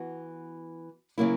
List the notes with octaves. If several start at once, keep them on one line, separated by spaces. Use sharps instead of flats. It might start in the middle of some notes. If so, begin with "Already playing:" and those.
Already playing: E3 B3 F#4
C#3 F#3 A#3 E4